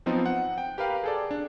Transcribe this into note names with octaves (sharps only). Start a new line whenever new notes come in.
F3 F#3 B3 C4 D#4 F4
F#5
G5
G4 A#4 B4 F5
G#4 A4 D5
D4